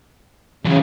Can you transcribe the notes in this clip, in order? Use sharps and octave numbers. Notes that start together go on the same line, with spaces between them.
C#3 E3 F#3